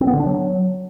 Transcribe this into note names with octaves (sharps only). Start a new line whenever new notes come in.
C4
B3
D3
D4
F#3